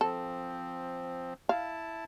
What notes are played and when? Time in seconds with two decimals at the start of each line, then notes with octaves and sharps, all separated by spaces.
0.01 F3 C4 A4
1.49 E4 F5 A5